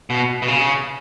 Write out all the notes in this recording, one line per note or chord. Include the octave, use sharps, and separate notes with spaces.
B2
B2
C#3